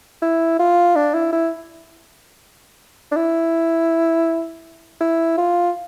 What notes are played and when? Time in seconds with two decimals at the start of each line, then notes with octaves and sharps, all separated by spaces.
0.22 E4
0.59 F4
0.96 D4
1.14 E4
1.32 E4
3.12 D4
3.16 E4
5.00 E4
5.37 F4